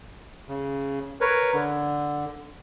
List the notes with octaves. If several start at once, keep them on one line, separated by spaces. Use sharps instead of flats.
C#3
A#4 B4 C#5
D3